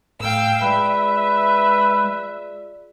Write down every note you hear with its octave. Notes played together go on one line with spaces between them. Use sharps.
A2 F5 G5 E6
G#3 F4 G#4 B4 D5 E5